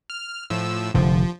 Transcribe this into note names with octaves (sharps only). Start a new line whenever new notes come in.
F6
A2 F3 E6
F1 D3 F3